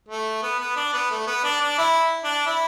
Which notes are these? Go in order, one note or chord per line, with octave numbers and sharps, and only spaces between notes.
A3
B3
B3
D4
B3
A3
B3
D4
D4
E4
D4
E4